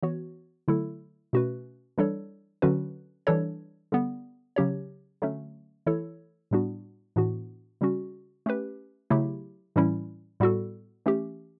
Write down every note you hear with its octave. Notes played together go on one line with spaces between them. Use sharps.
E3 B3 F#4 C#5
D3 F#3 A3 E4 A4
B2 A3 C#4 F#4 B4
E3 G3 D4 A4 C#5
D3 F#3 C#4 F#4 B4
E3 G3 D4 A4 C#5
D3 G3 B3
C#3 F#3 C#4 G4 C#5
D3 F#3 A3 C#4
E3 A3 E4 A4 C#5
A2 G3 B3 D4 F#4
A2 E3 B3 D4 F#4
C#3 G3 C#4 F#4
A3 C#4 G4 B4
C#3 F#3 A3 E4 G4
A2 E3 G3 C#4 E4
A2 G3 B3 F#4 A4
E3 A3 C#4 G4